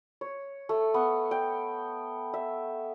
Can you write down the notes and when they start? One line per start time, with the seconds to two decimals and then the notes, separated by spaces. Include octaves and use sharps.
0.21 C#5
0.69 A3
0.94 B3
1.31 G5
2.34 E5